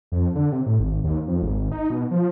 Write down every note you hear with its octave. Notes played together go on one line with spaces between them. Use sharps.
F2
D3
C3
A2
G#1
D#2
F2
G#1
D#4
B2
F3